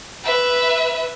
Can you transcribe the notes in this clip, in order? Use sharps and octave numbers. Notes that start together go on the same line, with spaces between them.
B4 E5